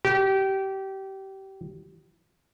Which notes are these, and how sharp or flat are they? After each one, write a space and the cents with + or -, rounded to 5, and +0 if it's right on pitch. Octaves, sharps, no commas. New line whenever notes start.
G4 -25